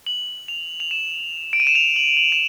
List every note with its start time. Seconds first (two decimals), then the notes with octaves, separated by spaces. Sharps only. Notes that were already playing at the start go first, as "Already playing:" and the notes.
0.07 F#7
0.48 F7
0.80 F7
0.91 E7
1.53 D7
1.60 D#7
1.67 E7
1.75 F7
1.96 F#7
2.17 F#7
2.32 E7